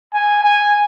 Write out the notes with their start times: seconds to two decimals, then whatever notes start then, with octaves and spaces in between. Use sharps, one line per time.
0.14 G#5
0.43 G#5